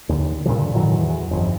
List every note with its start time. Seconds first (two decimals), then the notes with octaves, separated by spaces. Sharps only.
0.09 D#2 D3
0.45 G2 A#2 C#3 F3
0.58 D3
0.75 A2 D#3 E3 F#3
0.98 E2
1.31 G1 F2